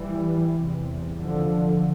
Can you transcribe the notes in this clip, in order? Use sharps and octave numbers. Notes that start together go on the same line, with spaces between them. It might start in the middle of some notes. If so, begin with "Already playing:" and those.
Already playing: E3 G3
E2 C3
D3 F3